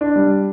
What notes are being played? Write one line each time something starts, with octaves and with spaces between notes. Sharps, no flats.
D4
G3